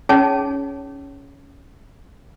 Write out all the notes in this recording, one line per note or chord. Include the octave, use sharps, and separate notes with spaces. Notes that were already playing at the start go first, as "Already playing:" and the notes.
C#4 D#4 G#4 C#5 A5